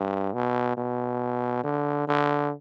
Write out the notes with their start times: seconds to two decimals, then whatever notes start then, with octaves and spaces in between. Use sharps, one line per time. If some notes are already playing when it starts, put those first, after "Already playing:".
Already playing: G2
0.33 B2
0.77 B2
1.63 D3
2.08 D3